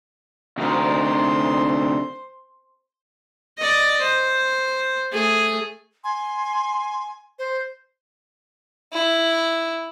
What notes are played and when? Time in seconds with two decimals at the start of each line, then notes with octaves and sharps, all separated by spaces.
0.58 D2 C3 D#4 A#4 C5 C6
3.58 D5 D#5
4.02 C5
5.13 A3 G#4
6.04 G#5 C6
7.39 C5
8.93 E4